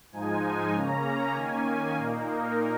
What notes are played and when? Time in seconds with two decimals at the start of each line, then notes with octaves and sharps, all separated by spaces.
0.12 G#2 F3 G#3 D#4 G#5
0.74 C#3 A#3 C#4 A#5
1.35 D#3 A#3 C#4 G#5
1.97 A#2 A#3 D#4 F5
2.27 A#4